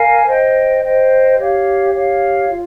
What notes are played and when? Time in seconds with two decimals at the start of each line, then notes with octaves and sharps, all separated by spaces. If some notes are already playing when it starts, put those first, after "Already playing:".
Already playing: A#4 F5 G#5
0.26 C5 D#5 G5
0.83 C5 D#5 G5
1.38 G4 C#5 F5
1.94 G4 C#5 F5
2.50 F4